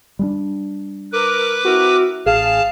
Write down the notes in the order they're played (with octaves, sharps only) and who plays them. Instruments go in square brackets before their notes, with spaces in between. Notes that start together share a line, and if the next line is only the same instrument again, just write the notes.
[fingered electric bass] G3 G#3 D4
[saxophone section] A#4 [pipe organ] B4 D6
[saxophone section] C4 E4 A#4 [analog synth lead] F#4
[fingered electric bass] A1 [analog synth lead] G#4 [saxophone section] F5 [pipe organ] A5